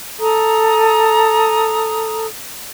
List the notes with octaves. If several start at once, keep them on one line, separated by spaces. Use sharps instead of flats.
A4 A#5 D#6